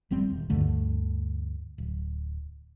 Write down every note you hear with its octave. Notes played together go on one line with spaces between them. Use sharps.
F1 G3 C4
D#1
D2 G2 D3 A3
D1